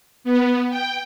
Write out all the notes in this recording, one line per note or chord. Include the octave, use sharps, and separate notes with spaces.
B3
G5